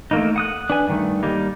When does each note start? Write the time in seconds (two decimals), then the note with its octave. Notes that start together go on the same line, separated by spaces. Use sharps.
0.11 A3 A#3 D#4
0.36 F#5 D#6 F#6
0.70 D4 B4 G#5
0.88 G2 D#3 A3
1.23 G3 A#3 D#4